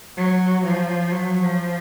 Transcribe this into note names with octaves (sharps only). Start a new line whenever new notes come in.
F#3
F3
F#3
F3